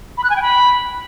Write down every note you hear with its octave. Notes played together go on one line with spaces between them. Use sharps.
B5
F#6
G#5
G5
B5